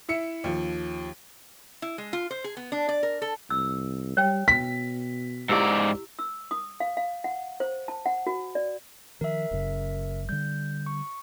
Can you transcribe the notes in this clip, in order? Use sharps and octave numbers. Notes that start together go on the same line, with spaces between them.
E4 E5 C#7
D#2 F3
E4
G#3
F4
C5
G#4
B3
D4
D5
A#4
A4
C2 E6
G3 C#5 G5
B2 B6
G#2 E4 G4 D5 E6
E6
D#6
F5
F5
F#5
C5
A5
F#5
F#4
D5
D#3 F3 A#4 E5
F#1 F#2 C#3
D3 G3 G6
C#6